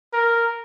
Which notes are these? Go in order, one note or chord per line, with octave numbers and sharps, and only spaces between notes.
A#4